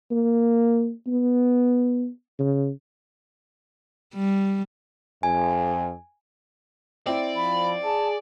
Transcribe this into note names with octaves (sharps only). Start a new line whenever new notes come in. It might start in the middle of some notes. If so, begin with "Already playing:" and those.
A#3
B3
C#3
G3
F2 G#5
C4 E4 D5
F3 B5
G#4 A5